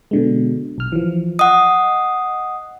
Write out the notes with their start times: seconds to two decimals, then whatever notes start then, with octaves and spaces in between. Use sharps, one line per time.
0.11 B2 D3 G#3
0.78 B1 F6
0.92 E3 F3
1.39 D#5 F#5 D#6